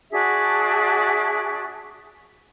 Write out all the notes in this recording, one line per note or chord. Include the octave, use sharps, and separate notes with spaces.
D4 F#4 G#4 E5